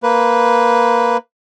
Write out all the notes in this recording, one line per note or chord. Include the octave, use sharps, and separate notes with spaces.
A#3 B4